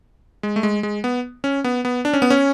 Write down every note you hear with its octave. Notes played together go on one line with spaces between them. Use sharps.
G#3
A3
G#3
G#3
B3
C#4
B3
B3
D4
C#4
B3
C#4